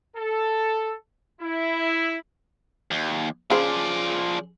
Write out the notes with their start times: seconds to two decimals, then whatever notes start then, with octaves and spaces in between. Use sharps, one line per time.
0.17 A4
1.42 E4
2.91 D#2
3.50 C#3 F3 G#4 C5 D5